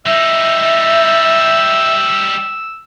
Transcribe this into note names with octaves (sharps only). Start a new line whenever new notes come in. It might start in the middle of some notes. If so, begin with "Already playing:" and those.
G3 D#4 E5 E6